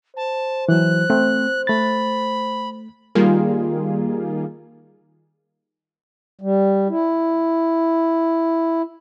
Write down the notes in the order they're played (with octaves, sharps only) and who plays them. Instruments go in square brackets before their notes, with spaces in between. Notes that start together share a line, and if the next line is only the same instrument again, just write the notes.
[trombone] C5 [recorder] A5
[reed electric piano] E3 F#3 [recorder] F#6
[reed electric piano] A3 C4
[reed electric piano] A3 A6 [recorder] B5
[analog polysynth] D#3 G3 A#3 F4 G#4
[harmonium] G3
E4